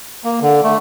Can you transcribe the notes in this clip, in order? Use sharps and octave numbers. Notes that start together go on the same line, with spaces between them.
A#3
D3
A3